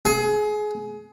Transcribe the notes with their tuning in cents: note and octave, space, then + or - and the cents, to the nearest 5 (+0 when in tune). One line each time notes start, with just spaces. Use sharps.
G#4 +25